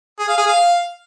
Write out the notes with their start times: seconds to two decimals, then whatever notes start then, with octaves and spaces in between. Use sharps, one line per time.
0.19 G#4
0.28 F5
0.38 G#4
0.47 F5